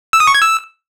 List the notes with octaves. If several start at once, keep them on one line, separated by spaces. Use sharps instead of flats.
E6
D#6
C#6
G#6
E6